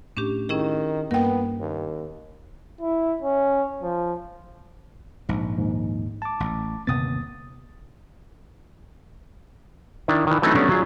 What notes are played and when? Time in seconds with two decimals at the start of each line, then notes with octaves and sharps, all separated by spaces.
0.17 A2 C#4 D4 G4
0.49 D#3 C#4 E4 G#4
1.11 G2 A#3 B3 A#4 G5
1.60 D#2
2.81 E4
3.22 C#4
3.83 F3
5.29 A#1 G#2
5.58 D#2 G#2
6.22 A5 D6
6.40 A1
6.87 G1 D#2 C3 B3 D#6 A6
10.08 D#3 D4 E4
10.27 D#3 E3
10.42 E3 F#3 A3 C4 C#4 D#4
10.55 F#3 G3 A3 B3 C#4 D4
10.69 F#3 F4 G#4